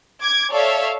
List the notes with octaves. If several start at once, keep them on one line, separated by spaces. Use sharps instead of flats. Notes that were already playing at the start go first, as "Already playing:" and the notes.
D6 G#6
A4 C#5 D5 E5 F5